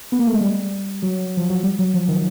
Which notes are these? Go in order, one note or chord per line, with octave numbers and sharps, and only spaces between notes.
B3
A#3
A3
G#3
G3
F#3
F3
F#3
G3
F#3
F3
D#3